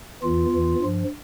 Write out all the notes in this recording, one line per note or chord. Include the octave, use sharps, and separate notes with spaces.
E2 E3 F4
E2 E3
G2 F3